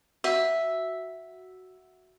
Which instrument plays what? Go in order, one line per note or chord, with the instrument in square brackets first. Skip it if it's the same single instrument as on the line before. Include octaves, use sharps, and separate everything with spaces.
[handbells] F#4 F#5 [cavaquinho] E5